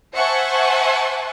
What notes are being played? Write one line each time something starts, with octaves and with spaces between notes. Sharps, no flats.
C5 E5 F#5 G#5 A5 C#6